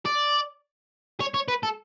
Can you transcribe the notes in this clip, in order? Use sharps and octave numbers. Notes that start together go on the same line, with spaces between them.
D5
C#5
C#5
B4
A4